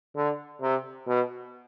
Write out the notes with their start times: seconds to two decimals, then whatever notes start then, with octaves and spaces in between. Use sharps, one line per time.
0.16 D3
0.61 C3
1.07 B2